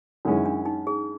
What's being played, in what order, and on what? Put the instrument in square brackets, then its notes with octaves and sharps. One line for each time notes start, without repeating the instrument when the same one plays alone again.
[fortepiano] F#2 D#3 G#3 C#4 E4 [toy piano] D4
[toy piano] D4
D#4
G#4